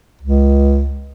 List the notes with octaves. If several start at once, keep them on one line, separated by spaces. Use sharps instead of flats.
C#2